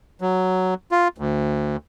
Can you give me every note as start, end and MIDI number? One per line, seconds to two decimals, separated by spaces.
0.21 0.74 54
0.92 1.08 65
1.18 1.76 38